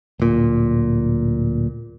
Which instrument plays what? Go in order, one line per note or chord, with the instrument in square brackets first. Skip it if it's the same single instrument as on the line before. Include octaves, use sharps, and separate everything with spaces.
[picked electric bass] D1 A#2